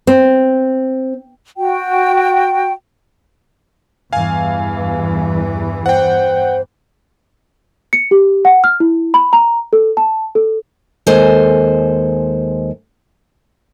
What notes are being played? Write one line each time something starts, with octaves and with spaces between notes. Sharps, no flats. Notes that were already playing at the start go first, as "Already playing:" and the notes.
C4
F#4 G5
E2 G2 E3 F5 G#5
C5 F#5 G5
C#7
G4
F#5
F6
E4
B5
A#5
A4
A5
A4
D#2 G#3 A4 C5 G#5